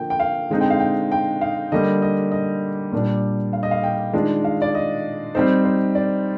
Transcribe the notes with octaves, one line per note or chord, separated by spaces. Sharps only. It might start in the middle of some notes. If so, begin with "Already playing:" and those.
Already playing: D3 F3 A#3 G5
G5
F5
D3 G#3 C4 D#4
G5
F5
G5
G5
F5
D3 G3 A#3 D#5
D#5
D#5
A#2 G3 D4
F5
D#5
F5
G5
D#3 G#3 D4 F4
F5
D5
D#5
G3 C4 D#4 C5
C5
D5